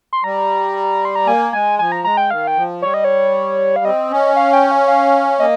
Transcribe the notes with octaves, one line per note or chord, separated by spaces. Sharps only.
C6
G3 A#5
C6
A#5
A#3 G#5
G#3 G#5
F3 G#5
A#5
G#3 A#5
G5
D#3 F5
G5
F3
G3 C#5
D#5
C#5
F5
C4 D#5
C#4
F5
G5
F5
F5
A#3 D#5